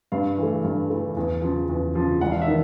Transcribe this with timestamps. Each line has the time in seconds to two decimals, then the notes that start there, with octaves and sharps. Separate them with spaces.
0.12 G2 F5
0.38 E3 A3
0.64 G2
0.90 E3 A3
1.17 E2
1.42 C#3 F3
1.69 E2
1.95 C#3 F3
2.21 E1 F#5
2.31 F5
2.42 E5
2.48 D#3